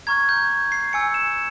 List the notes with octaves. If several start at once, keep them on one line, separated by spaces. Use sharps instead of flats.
A#5 C#6 F6 G#6
G6
C7
G#5 E6 G6 C#7
E7